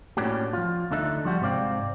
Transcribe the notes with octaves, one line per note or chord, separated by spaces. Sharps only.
A2 A#3 C#4 D4 F#4 G4
F3 F4
D2 D3 D4 D#4 A4 E5
F3 G3 F#4
G#2 C3 C4 D5 F5 G5